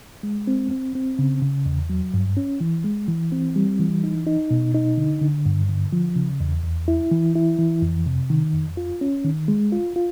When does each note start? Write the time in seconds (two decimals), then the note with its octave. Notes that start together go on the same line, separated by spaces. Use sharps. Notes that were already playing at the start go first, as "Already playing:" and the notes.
0.23 G#3
0.47 C4
0.71 C4
0.95 C4
1.19 C#3
1.42 C#3
1.66 E2
1.90 F#3
2.14 G2
2.37 C#4
2.61 E3
2.84 G#3
3.08 E3
3.32 C4
3.56 G3
3.80 E3
4.04 D#4
4.27 D#4
4.51 B2
4.75 D#4
4.98 D3
5.21 D3
5.46 G2
5.69 D3
5.93 F3
6.16 C#3
6.40 E2
6.64 E2
6.88 E4
7.11 E3
7.35 E4
7.58 E3
7.82 F2
8.06 C3
8.30 D#3
8.53 F2
8.77 F4
9.01 C#4
9.24 D#3
9.48 G#3
9.72 F4
9.96 F4